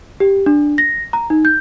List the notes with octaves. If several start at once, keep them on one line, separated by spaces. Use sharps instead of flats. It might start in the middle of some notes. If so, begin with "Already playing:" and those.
G4
D4
A#6
A#5
D#4
G6